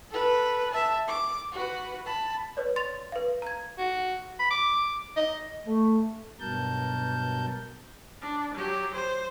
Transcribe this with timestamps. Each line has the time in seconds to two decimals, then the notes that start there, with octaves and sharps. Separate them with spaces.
0.11 A4 B4
0.71 E5 A5
1.08 D6
1.52 F#4 B4
2.06 A5 B5
2.57 B4 C#5 D5
2.76 C6 A6 F7
3.12 B4 F5
3.42 A#5 G#6
3.78 F#4
4.39 B5
4.51 D6
5.16 D#5
5.67 A3
6.40 G2 B2 F#3 A#4 A5 G6
8.21 D4
8.54 F#3 G4
8.94 C5